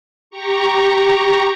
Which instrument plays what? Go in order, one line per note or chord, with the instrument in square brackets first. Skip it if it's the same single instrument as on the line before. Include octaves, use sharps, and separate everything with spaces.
[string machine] G4 A#5 C#6